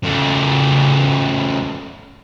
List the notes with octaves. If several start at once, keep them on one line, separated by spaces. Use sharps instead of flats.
C#3 A3